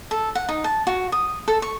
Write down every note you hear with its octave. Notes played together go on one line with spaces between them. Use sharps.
A4
F#5
D#4
A5
F#4
D#6
A4
C#6